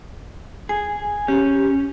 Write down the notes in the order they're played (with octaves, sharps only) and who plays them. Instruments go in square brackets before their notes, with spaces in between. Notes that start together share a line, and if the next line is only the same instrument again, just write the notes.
[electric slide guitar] G#4 [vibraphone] G#5
[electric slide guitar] C#4 [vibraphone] G4